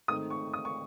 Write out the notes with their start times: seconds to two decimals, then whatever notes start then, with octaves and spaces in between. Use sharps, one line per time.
0.08 G#2 D#3 A3 C4 D#6
0.30 C#6
0.54 D#6
0.65 C#6